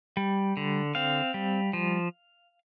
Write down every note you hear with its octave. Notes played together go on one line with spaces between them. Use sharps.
G3
D3
C4 F5
G3
F3